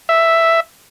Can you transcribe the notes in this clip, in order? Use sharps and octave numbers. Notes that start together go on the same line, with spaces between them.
E5